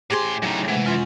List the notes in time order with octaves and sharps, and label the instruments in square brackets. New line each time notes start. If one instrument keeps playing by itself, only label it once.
[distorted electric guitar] A2 C6 [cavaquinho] G4 G#4 C5
[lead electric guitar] A2 C#3 [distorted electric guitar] F#3 D#4
[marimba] C3 G#3 F#5 [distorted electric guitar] E3
[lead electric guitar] F#2 [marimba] F4 C6